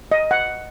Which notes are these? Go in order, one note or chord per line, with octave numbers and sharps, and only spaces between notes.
D#5
F#5